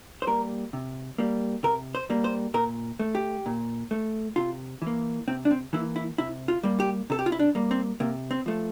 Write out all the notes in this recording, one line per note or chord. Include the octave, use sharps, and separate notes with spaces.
C5
G3 A#3 A#4
C3
G3 A#3
C3 A#4
C5
G3 A#3
C5
A#2 A#4
A3
G4
A#2
A3
C3 F4
E3 A#3
C3 C4
D4
C4
E3 A#3 E4
E4
C3 E4
F4
G3 A#3
G4
C3 A4
G4
F4
E4
D4
G3 A#3
C4
C3 A#3
C4
F3 A3